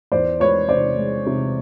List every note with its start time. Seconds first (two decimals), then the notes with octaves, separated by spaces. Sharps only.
0.12 E2 C5 D5
0.40 G#3 B4 C#5
0.69 C3 C5 D5
0.97 G#3
1.26 C3